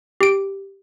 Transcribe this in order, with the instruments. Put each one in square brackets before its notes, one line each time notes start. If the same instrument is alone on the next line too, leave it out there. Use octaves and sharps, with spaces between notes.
[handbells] G4 D7